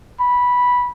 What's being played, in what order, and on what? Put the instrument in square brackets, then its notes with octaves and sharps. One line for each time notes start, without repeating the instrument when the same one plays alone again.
[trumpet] B5